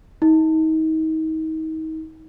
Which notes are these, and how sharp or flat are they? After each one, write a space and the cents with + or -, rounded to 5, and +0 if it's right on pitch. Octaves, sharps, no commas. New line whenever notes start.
D#4 +30